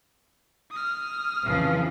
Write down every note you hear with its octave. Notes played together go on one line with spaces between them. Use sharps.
D#6 F6
F2 C#3 E3 F3